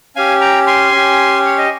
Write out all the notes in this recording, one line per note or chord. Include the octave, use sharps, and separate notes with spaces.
C#4 G4 F5 G#5
G5 A#5
G#5 C6
C#4 G4
C#5
D#5